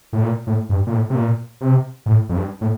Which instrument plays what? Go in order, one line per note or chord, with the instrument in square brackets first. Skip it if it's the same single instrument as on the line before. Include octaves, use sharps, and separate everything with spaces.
[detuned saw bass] A2
A#2
A2
G2
A#2
A2
C3
A#2
C3
A2
F2
G2
A2